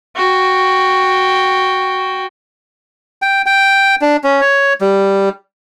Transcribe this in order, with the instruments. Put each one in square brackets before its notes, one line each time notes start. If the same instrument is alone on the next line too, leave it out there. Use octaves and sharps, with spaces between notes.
[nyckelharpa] F#4 G5
[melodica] G5
G5
D4
C#4
C#5
G3